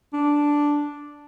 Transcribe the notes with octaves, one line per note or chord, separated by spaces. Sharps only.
D4